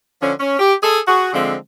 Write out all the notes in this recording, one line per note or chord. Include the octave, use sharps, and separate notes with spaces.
D3 F3 C#4
C#4
G4
G#4 A4
F#4 G#4
D3 F3 G#3 C4